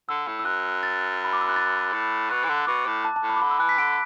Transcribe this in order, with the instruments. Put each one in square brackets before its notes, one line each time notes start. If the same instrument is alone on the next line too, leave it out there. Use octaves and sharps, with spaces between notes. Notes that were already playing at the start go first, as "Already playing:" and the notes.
[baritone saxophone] D3 [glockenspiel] E6
[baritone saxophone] A2
[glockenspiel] E6
[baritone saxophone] F#2 [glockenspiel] F#6
[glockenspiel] A6
B5
D6
E6
F#6
A6
[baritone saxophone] A2
[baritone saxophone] B2 [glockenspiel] F#6
[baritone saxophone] E3
D3
[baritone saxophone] B2 [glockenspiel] D6
[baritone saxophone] A2
[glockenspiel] A5
A5
[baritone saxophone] A2
[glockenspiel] B5
D6
[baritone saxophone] D3 [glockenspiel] B5
[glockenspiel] E6
[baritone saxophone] E3 [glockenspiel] F#6
[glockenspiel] B6
[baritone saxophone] D3 [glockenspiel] D7